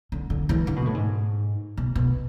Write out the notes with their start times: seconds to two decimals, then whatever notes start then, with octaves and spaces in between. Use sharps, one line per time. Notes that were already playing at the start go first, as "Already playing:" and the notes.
0.12 D3
0.30 D3
0.49 E3
0.67 D3
0.76 B2
0.86 A2
0.94 G#2
1.77 B2
1.95 B2